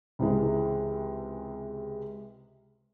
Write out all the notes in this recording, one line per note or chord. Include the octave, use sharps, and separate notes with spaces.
C#2 C3 E3 G#3